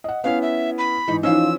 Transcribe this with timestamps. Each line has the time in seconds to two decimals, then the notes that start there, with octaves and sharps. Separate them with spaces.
0.04 D#5 F#5
0.24 B3 C#4 E4 F5
0.42 E5
0.78 B5
1.08 G#2 E3 D#4
1.23 E3 F3 C#4 D#4 F4 E6